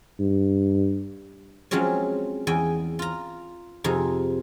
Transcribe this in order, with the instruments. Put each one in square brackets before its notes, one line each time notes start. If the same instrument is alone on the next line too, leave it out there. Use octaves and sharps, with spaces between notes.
[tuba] G2
[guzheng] F3 F#3 G#3 C4 C#4
E2 D#5 G5 G#5
F4 A#5
F2 C3 D#4 G#4